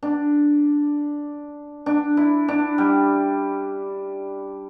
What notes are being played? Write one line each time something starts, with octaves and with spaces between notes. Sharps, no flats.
D4
D4
E4
D4
G3